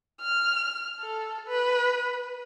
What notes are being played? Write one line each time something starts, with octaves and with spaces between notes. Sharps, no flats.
F6
A4
B4